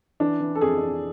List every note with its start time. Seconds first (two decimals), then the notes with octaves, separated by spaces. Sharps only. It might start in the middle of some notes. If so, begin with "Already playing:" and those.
0.20 E3 D4
0.40 E3
0.55 A4
0.61 F2 G#4
0.81 F2